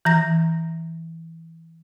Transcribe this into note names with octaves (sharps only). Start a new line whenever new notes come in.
E3 A#5 A#6